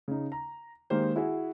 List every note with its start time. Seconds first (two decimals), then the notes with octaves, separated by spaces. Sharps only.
0.08 C#3 D#4
0.32 A#5
0.90 D#3 G#3 A#3 G4 C5
1.16 E4 F#4 G#4